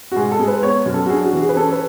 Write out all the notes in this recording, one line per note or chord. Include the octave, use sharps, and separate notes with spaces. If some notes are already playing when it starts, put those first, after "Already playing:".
F#4
G#2 G#4
A4
G#3
B4
B3 C#5
F#2
A4
F#4
D4 G#4
F#4
E3
G#4
B4
C#4 A4
B4